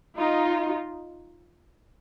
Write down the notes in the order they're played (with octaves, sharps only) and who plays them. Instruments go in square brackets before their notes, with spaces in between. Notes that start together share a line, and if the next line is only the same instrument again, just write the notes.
[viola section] D#4 F4